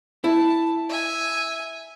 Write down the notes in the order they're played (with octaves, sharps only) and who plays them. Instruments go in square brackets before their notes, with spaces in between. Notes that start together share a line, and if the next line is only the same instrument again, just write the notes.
[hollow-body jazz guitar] E4 [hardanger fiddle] A5
[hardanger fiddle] E5 G#5